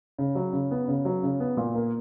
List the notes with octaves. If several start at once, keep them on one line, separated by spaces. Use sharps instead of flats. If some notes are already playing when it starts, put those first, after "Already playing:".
C#3
F#3
C#3
B3
C#3
F#3
C#3
B3
A#2
A#3